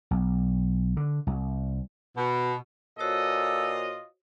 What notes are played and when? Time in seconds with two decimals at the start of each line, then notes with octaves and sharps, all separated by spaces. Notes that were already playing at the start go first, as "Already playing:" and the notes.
0.11 B1
0.97 D3
1.27 C2
2.16 B2
2.99 A#2 F4 F#4 A4 C5 C#5 D#5